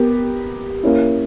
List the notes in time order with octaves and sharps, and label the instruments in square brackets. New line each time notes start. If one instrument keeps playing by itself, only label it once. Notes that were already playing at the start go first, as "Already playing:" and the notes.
Already playing: [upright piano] B3 G4 A#4
A#3 C#4 E4